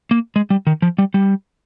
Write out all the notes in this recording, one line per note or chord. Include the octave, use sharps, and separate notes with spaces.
A#3
G#3
G3
D#3
F3
G3
G3